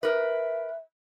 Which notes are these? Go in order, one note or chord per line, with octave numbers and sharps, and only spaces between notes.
A#4 B4 E5